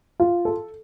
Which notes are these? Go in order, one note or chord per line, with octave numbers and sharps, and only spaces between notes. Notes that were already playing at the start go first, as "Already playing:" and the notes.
F4
A4